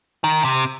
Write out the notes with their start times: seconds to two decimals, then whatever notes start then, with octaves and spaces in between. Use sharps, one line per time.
0.24 D#3
0.45 C3